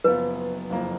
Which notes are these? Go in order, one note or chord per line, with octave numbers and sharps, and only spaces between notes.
F#1 F#2 F3 B3 F4 B4
F#1 F2 F3 A#3